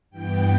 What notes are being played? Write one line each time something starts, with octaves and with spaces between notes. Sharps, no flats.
G2 E3 B3 G5